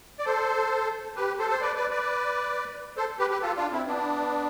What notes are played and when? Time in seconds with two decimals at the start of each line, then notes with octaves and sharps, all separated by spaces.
0.19 D5
0.25 A4 C5
1.16 G4 B4
1.39 A4 C5
1.50 C5
1.61 B4 D5
1.76 B4 D5
1.91 B4 D5
2.97 A4 C5
3.19 G4 B4
3.30 G4 B4
3.42 F4 A4
3.56 D4 F4
3.71 C4 E4
3.87 B3 D4